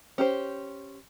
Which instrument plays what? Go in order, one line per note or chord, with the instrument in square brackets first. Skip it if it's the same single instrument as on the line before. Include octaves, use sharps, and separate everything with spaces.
[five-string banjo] C#4 G4 C5